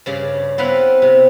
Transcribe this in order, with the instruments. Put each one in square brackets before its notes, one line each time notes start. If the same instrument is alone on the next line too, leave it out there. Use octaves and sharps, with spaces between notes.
[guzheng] G2 C#3 D5
B3 C4 E4 B4 F5 F#5
C3